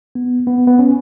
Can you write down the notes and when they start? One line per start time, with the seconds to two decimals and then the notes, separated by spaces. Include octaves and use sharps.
0.15 B3
0.47 B3
0.67 B3
0.79 C#4